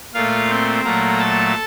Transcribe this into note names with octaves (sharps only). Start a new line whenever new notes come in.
A#2 A3 F4 F5
C4 C5
A#2 F#3 A3 A#3 A#4
A4 A5